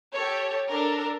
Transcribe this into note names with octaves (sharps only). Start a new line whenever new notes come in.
G4 A4 C#5
D4 A4 A#4